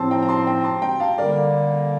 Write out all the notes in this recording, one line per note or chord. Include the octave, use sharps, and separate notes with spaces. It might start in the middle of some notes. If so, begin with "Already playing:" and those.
Already playing: A2 F3 C4 A5 C6
G5 A#5
A#5
A5 C6
G5 A#5
A5 C6
G5 A#5
F5 A5
D3 G3 A#3 A#4 D5